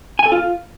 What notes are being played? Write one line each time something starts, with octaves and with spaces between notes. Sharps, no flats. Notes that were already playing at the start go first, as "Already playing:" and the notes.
G#5
A4
F4